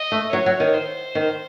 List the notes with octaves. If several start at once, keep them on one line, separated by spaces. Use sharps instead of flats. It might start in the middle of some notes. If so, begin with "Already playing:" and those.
Already playing: D#5
A3
F#3 C#5
F#3
D#3
C5
D#3